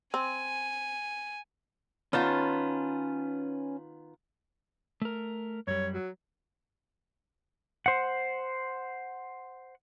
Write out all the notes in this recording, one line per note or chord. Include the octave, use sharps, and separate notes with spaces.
C4 G#5
D#3 B3 C#4 F4 B4 A5
A3 A#4
F#2 G3 C#5
F#3
C5 F#5